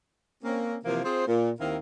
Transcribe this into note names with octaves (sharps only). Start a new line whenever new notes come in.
A#3 C4 C#4
C3 E3 F3 A#3
C4 F4 G#4 C5
A#2
D#2 D#3 C4 E4 A#4 F5